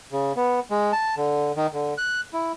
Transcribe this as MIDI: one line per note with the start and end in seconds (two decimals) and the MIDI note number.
0.12 0.32 49
0.36 0.60 59
0.71 0.92 56
0.93 1.15 81
1.17 1.52 50
1.57 1.67 51
1.73 1.94 50
1.98 2.21 90
2.33 2.52 64